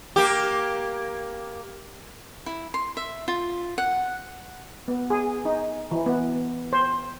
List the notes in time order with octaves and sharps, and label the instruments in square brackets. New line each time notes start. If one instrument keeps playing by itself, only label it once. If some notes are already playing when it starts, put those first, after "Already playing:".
[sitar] A#3 G4
[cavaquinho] E4
C6
E5
F4
F#5
[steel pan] B3
G#4
D#4
E3
B3
C5